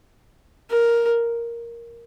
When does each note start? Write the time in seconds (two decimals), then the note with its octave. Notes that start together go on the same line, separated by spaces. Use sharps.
0.71 A#4